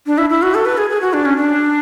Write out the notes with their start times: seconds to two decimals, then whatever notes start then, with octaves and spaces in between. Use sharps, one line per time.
0.06 D4
0.18 E4
0.30 E4
0.42 F#4
0.54 A4
0.65 B4
0.77 G#4
0.90 G#4
1.01 F#4
1.13 D4
1.25 C#4
1.37 D4